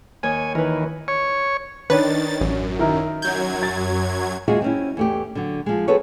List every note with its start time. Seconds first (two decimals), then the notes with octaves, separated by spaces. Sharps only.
0.23 D#2 C#5 G#5
0.55 D#3 E3 A#4 B4
1.08 C#5
1.90 D#3 D4 B4 C#5 A6
2.41 A1 F#2
2.79 D#3 E4 A#4
3.22 F#2 F#3 G6 G#6
3.63 A6
4.48 D#2 G#3 F4 F#4 G#4 E5
4.62 C4 C#4 E4
4.97 E2 A3 G4
5.35 D3 F#3
5.66 F3 G#3
5.88 C4 F#4 G#4 A4 B4 C#5